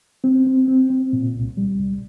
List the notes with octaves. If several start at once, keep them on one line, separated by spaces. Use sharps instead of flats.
C4
C4
C4
C4
A#2
C2
G3
C2